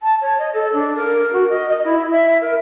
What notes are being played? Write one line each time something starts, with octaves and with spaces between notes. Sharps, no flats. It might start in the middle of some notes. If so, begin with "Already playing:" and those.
A5
C#5
D#5
A4
D4
A#4
F#4
D#5
D#5
E4
E5
A#4